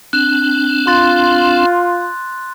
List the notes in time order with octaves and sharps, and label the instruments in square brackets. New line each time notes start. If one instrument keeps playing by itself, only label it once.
[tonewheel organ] C4 D4 [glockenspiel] F#6
[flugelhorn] F4 [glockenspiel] C6 F#6 A6